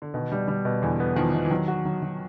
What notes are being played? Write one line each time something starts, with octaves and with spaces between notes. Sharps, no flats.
D3
B2 D#3
G3
G3
B2
E2 D3 E3
B3
D#3 F3 B3
B2
E3
D#3 F#3
F#4
F#3
F#3